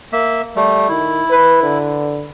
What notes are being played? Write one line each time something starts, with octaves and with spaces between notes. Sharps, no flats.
A#3 E5
G3 A3
D#3 E4
B4
D3